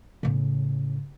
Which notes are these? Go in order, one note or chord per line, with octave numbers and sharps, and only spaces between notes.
A2 C#3